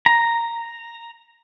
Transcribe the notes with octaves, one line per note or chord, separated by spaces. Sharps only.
A#5